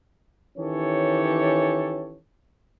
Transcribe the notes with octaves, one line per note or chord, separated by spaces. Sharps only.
D#3 E3 C#4 G4 A4 C#5